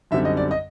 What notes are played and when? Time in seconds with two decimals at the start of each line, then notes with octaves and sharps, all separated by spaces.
0.11 F#2 D3 G3 C4 D#4 E5
0.25 D#5
0.37 D5
0.51 D#5